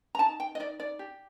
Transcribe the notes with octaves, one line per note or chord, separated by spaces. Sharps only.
A#5
D#4 A5
G5
D#5
D#4 D5
D5
G4